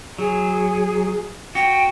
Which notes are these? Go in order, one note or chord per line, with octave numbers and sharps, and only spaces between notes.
F#3 G#4
F#4 G5